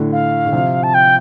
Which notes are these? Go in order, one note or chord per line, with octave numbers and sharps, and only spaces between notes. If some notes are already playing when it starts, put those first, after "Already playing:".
Already playing: A2 D3
F5
D3
C3 F3
A5
G5